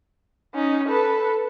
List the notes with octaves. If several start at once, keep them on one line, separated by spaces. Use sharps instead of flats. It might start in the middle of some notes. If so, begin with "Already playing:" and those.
C#4 D#4
A4 B4